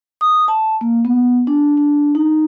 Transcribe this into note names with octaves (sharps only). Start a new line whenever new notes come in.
D#6
A5
A#3
B3
D4
D4
D#4